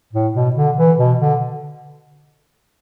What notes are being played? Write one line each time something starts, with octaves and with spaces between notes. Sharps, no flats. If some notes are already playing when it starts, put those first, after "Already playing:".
A2
B2
D3
E3
B2
D3